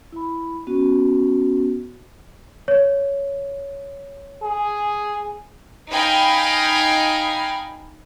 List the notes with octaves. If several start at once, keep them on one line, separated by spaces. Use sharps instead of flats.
E4 B5
B3 C#4 F#4
C#5
G#4
D#4 D#5 F5 G5 G#5 B5